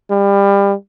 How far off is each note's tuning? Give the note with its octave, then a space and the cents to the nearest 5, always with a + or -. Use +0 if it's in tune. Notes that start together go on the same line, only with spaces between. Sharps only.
G3 +25